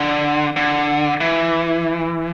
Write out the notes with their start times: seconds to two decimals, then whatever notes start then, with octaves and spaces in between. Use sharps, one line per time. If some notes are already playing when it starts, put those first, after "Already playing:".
Already playing: D3
0.56 D3
1.20 E3